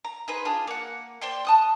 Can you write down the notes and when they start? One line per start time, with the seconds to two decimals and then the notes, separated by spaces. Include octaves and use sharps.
0.05 A#5
0.28 D#4 G#4 B4 C5
0.45 D4 F4 G#4
0.67 A#3 F#5
1.21 C5 D5 G5 C6
1.45 A5 D#6 F#6